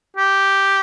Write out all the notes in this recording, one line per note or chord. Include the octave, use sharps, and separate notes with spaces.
G4